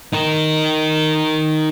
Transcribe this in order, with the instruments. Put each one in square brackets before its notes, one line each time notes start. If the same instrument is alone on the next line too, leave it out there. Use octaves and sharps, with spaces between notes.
[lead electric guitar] D#4 A#4